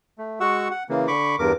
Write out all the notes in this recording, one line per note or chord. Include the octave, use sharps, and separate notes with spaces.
A3
G#3 F#4 F#5 C#6 E6
F#5
C#3 E3 A#3
D3 B5 C#6 D6
E2 G2 A#4 D6